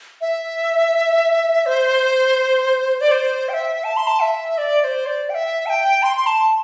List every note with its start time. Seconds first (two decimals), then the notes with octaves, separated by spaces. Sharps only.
0.21 E5
1.66 C5
3.01 D5
3.11 C5
3.49 G5
3.53 E5
3.84 A5
3.97 C6
4.07 A5
4.22 E5
4.58 D5
4.81 D5
4.84 C5
5.06 D5
5.30 G5
5.34 E5
5.66 A5
5.70 G5
6.03 C6
6.17 C6
6.26 A5